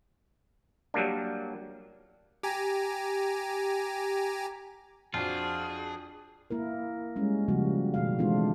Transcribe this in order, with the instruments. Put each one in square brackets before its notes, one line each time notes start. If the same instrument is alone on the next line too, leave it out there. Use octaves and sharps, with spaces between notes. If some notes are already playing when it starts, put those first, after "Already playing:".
[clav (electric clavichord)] F#3 G3 A#3 D4
[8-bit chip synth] G4 G#5 A#5
[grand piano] F2 [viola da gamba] F3 D4 F#4 [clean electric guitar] F4 [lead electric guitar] G#4
[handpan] A#3 E4 A#4
G3 G#3 C#4
C#3 F3 G3 A#3 F#4
B2 D#3 F5
E3 G#3 A3 C4 D4 F4